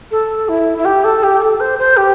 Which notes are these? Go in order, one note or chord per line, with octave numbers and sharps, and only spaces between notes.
A4
E4
E4
G4
A4
G4
A4
C5
C5
G4